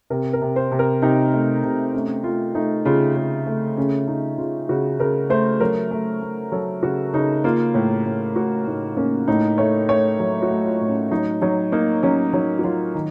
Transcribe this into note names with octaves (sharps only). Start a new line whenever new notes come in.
C3 A#4
A#4
C3
C5
C3
A#4
C3 D#4
A3
C3
A3 C#4
A3 F4
A3 D#4
C#3 F4
C#3
A3
C#3 C#4
C#3 D#4
C#3 F4
C#3 F#4
C#3 A#4
A3 C5
F#3 A#4
A3
A3
F#3 A4
C#3 F#4
C#3 D#4
A#3 F4
A2
A2
A2 F#4
A2 D#4
A#3 C#4
A2 D#4
A3 C#5
A3 C#5
F#3
F#4
A3
F4
A2
C#4
F#3 D#4
F#3 D#4
A#3 D#4
F#3 C#4
F#3 D#4
F#4
F#3 F4
D#3 D#4